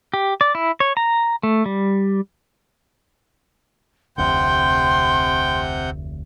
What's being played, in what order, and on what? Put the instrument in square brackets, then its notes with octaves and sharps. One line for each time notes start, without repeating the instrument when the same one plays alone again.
[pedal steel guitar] G4
D5
E4
C#5
A#5
A3
G3
[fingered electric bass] F1 D2 [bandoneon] C3 F#5 G6 [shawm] G5 [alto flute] C6